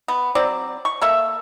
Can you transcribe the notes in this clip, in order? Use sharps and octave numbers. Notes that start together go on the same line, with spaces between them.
B3
F#3 C4 D5
C#6
A#3 A4 E5